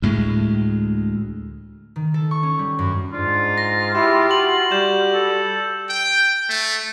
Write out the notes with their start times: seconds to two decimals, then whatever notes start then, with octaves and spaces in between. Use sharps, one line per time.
0.02 D2 A2 G#3
1.96 D#3
2.14 A4
2.31 C#6
2.43 C#4
2.59 G3
2.79 F#2
3.13 G#2 D4 F4
3.58 A#6
3.95 E4 G4
4.31 F#4 F#7
4.71 G3 G6 E7
5.14 A4
5.89 G5
6.49 A3